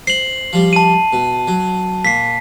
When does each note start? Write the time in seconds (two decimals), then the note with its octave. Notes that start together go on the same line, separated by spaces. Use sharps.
0.07 C5 C7 F#7
0.53 F3 G3
0.73 A5 D#7
1.13 B2
1.48 F#3
2.05 A#2 B6 C7